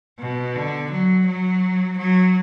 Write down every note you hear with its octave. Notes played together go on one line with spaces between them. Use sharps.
B2
D3
F#3
F#3
F#3